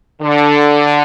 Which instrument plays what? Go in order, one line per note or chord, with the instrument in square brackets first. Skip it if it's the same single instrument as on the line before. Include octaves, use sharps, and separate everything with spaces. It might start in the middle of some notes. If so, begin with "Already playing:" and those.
[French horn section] D3